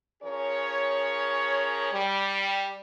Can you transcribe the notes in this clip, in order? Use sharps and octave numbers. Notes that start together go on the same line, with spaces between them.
F3 C#4 G#4 A#4 C#5
G3